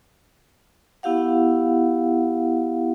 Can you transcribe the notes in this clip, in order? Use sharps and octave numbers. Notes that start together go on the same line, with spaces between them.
B3 E4 G4 F5 F#5